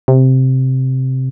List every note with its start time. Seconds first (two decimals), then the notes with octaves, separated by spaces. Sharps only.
0.08 C3